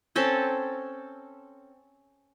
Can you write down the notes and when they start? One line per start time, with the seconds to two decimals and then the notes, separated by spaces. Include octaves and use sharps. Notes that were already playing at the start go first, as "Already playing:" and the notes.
0.16 C4 C#4 A4